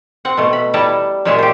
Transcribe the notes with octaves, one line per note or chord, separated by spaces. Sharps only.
C4 F#5
B2 A3
B5
G3 E4 A4 G5 A5 A#5
F#2 A#2 G#3 C#5 E5 A5
G4 C5